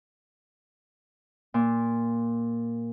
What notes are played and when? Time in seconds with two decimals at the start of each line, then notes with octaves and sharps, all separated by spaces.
1.54 A#2